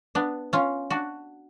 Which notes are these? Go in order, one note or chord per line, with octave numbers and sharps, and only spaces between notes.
B3 D4
C#4 F4
D4 F#4